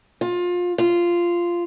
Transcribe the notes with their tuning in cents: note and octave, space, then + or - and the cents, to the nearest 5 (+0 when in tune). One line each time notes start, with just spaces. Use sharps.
F4 +25
F4 -10